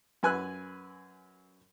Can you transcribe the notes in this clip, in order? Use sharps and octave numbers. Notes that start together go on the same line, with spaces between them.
F#2 B4 G#5 E6 F#6